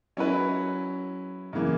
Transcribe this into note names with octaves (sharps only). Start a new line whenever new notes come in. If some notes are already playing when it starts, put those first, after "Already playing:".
F#3 C#4 E4 B4
F#2 C#3 E3 A#3